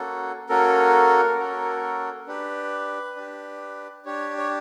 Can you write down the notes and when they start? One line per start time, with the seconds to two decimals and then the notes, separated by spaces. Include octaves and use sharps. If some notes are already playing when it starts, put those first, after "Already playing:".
Already playing: A#3 C#4 F#4 A4
0.49 A#3 C#4 F#4 A4 A#4
1.39 A#3 C#4 F#4 A4
2.27 D4 G4 B4
3.16 D4 G4
4.05 D4 G4 C#5
4.38 C#5